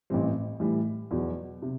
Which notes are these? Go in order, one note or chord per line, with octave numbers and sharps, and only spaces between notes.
A1 A2 E3 G3 C4
A2 E3 G3
E2 B2 F#3
C3